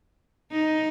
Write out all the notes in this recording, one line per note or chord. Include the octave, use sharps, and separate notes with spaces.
D#4